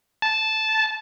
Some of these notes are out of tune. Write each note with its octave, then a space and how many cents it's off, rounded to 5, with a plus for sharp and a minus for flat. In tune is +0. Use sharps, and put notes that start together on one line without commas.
A5 -10